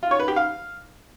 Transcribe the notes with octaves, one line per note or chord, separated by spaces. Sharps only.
F4
C#5
B4
G4
F5